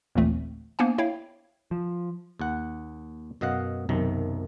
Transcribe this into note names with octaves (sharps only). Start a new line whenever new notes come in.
G1 D#2 A#2 E3 A3 C4
A#3 B3 D4 C5 F#5 G#5
E4 C#5 E5 F5 G5
F3
D#2 F#5
F#2 B2 D#5 F5 F#5
B1 F#2 C3 D#3